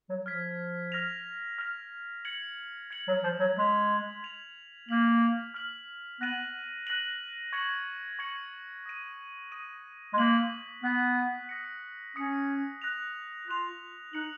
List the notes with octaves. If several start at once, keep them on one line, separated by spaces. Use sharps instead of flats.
F#3
F3 F6 G#6 B6
F6 A#6 F7
F6 A#6 F7
G#6 C#7 F#7
G#6 C#7 F#7
F#3
F3
F#3
G#3 G#6 B6 F7
G#6 B6 F7
A#3 F6 B6 F#7
F6 B6 F#7
B3 F#6 A#6 D#7 F#7
F#6 A#6 D#7 F#7
C#6 G#6 C#7 F#7
C#6 G#6 C#7 F#7
D#6 A#6 D#7
D#6 A#6 D#7
G#3
A#3 F#6 B6 F#7
B3 F#6 B6 F#7
D#6 A#6 C#7
C#4 D#6 A#6 C#7
F#6 A#6 F7
F4 F#6 A#6 F7
D#4 F#6 C#7 F#7